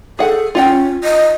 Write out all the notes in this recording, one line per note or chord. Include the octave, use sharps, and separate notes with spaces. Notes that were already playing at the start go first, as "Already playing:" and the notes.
G#4 A4 F#5
C#4 F4 F#5 G5
D#5